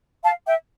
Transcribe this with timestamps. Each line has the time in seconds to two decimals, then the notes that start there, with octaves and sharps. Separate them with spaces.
0.23 F5 A5
0.46 E5 G5